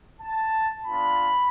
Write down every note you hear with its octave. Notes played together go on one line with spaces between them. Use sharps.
A5
B3 D4 F4 B5